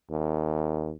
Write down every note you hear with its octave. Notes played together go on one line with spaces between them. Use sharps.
D#2